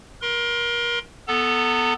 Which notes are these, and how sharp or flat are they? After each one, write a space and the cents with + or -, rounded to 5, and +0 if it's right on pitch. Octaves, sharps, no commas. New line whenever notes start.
A#4 +30 C6 +0
B3 +0 A4 +0 A#5 -45